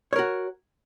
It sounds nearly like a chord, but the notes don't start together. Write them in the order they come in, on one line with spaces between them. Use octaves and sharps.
C#5 A#4 F#4